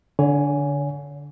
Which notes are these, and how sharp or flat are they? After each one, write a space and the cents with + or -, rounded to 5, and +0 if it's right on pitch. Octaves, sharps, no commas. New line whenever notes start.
D3 -15 C#5 +35 G#5 +0